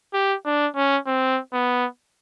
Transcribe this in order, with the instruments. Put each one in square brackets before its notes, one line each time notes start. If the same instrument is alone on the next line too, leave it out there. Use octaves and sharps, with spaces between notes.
[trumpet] G4
D4
C#4
C4
B3